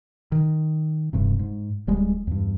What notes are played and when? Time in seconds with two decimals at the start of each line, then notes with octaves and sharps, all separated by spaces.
0.32 D#3
1.13 E1 G2 C3
1.39 G#2
1.87 D1 G3 G#3
2.27 E2 G2